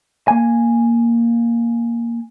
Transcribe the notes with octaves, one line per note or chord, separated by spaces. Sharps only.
A#3 G#5